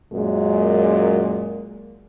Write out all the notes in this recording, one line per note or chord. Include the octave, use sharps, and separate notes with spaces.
F#2 A#2 G#3